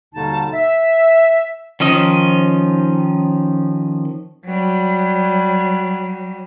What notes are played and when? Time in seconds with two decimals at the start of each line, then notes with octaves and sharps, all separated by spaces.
0.14 D#2 B2 D3 G3 D#4 A5
0.53 E5
1.80 D#3 F3 C#4 D#5
4.46 F#3 G3